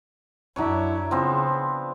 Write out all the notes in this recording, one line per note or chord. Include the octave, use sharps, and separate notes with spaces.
F#2 F#3 D4 E4 C#5
C#3 F3 B3 C4